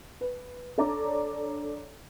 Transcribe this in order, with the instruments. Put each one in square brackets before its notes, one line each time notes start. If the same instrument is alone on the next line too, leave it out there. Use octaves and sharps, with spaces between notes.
[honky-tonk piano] B4
D4 A4 C#5 D5 A#5 D6